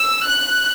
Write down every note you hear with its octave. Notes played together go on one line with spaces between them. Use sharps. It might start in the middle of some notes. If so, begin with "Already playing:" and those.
Already playing: E6
F#6